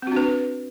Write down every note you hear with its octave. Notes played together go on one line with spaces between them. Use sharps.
C4 D4 F#4 B4